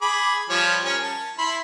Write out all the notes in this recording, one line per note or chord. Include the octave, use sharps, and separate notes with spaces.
G#4 B5 D6
F3 G3 C#5
C#4 A#4 C#5
A5
E4 B5 C6